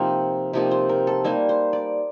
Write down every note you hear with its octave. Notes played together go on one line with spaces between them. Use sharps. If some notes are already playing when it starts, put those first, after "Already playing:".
Already playing: C3 F3 A#3 D#4 A#4
C3 F3 A#3 D#4 G4
C5
A#4
A4
G3 A#3 D#4 C5
C5
D5